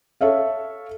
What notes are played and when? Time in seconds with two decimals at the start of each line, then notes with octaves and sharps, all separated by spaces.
0.21 A4 C#5 E5 F5